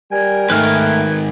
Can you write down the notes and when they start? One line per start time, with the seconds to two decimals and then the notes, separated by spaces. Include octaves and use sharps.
0.11 G3 A#4 G5 G#5
0.50 G#2 D#3 A3 B4 F6